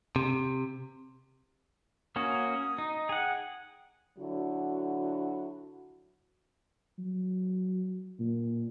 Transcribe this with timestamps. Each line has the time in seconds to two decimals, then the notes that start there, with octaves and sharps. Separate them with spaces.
0.16 C3
2.16 A#3 C#4 F#4 D#6
2.78 D#4
3.09 G#4 F#5 G5
4.18 D3 F#3 E4 F#4
6.99 F#3
8.19 A#2